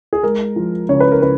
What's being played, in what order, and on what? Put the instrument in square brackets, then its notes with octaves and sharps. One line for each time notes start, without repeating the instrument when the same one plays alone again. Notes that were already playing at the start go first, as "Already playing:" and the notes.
[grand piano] G#4
G#3 A#4
F3
C#3 C#5
B4
A#4
C#3 B4